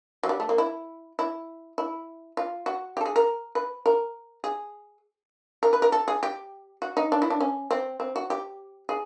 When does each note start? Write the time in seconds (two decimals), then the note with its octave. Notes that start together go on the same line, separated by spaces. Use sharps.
0.23 F#3
0.29 G3
0.40 A3
0.49 A#3
0.58 E4
1.19 E4
1.78 E4
2.37 F4
2.66 F#4
2.97 G4
3.01 A4
3.06 G#4
3.16 A#4
3.55 B4
3.86 A#4
4.44 G#4
5.63 A#4
5.73 B4
5.82 A#4
5.92 A4
6.08 G#4
6.23 G4
6.82 F#4
6.97 D#4
7.12 D4
7.22 E4
7.30 D4
7.40 C#4
7.71 C4
8.00 C4
8.16 F#4
8.30 G4
8.89 G#4